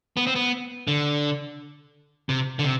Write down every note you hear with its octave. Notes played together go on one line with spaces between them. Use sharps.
B3
C4
B3
D3
C3
D3
C3